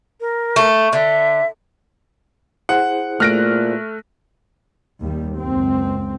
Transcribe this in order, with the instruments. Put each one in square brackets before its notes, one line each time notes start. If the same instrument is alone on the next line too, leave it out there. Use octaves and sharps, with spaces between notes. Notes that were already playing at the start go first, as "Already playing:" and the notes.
[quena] A#4
[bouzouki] A3
[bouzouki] D3 [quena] E5
[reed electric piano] E4 G#4 C5 [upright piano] F#5
[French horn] A#2 [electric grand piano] A3 F#6 [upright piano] F6 A#6 D7
[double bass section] D#2 G3
F#1 C#2 C4